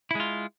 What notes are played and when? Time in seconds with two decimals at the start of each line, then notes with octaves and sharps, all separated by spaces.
0.11 E4
0.15 G#3
0.20 F4